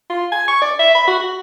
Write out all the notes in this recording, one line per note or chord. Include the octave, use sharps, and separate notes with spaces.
F4
G#5
C#6
D5
E5
B5
F#4
F#4